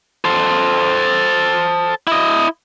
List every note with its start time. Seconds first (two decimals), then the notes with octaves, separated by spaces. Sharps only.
0.25 A4 C5
2.07 E4 D#5